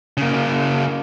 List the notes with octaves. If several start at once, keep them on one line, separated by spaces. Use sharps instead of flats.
C#3 A#3